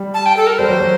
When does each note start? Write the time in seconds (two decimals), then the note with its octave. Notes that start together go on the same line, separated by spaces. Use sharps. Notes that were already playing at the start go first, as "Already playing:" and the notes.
Already playing: G3
0.14 A5
0.26 G5
0.37 A4
0.47 A#4
0.59 G3 C5
0.69 F#3
0.80 F#3